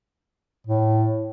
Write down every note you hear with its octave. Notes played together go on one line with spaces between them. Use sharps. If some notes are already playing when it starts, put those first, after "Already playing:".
A2